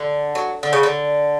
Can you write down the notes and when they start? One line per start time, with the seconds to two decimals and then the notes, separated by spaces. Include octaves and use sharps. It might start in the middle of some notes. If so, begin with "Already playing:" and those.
Already playing: D3
0.35 F#3
0.63 D3
0.73 C#3
0.83 D3